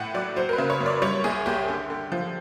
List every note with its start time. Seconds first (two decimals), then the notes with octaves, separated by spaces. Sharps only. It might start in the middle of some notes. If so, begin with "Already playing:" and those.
Already playing: A2 A3 F#5 G5
0.14 F#3 D5
0.36 F#3 C5
0.49 A#4
0.53 B4
0.58 C#3
0.70 C#5
0.80 F#2
0.86 D5
1.02 G3 C#5
1.24 C2 G#4
1.46 C2 G4
1.68 D3
1.90 D3
2.12 F3